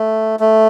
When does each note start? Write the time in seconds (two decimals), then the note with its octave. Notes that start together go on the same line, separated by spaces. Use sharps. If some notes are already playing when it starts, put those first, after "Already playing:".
Already playing: A3
0.40 A3